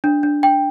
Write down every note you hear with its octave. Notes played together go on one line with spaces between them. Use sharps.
D4
D4
G5